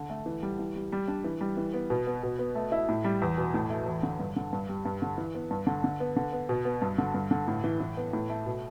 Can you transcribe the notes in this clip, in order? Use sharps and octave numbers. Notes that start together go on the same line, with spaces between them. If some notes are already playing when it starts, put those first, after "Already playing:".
Already playing: D3
A3
E3
G3
E3
G3
G3
D4
E3
G3
E3
B3
B2
B3
B2
B3
A3
E4
A2
G3
E2
B2
A2
A3
E2
D3
G2
D3
G2
G3
G2
D3
E3
B3
G2
D3
D3
B3
D3
B3
B2
B3
G2
D3
G2
D3
A2
E3
E3
B3
A2
A3
B2